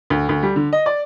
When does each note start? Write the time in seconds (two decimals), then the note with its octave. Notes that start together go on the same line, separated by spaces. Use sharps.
0.10 D2
0.29 D2
0.43 G3
0.56 D3
0.73 D#5
0.86 D5